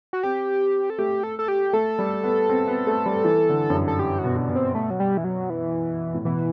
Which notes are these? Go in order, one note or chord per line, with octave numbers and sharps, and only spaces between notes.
F#4
C4 G4
A4
A3 G4
A4
A4
G4
A3 A4
G3
B3
C4
B3
A3
G3
E3
D3
F#2
G2
A4
G4
F#4
B2
D4
B2
C4
A3
F#3
G3
E3
F#3
E3
A2
B2 E3